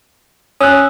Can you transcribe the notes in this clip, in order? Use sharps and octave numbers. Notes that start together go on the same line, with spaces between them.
C#4 D#6 E6 F#6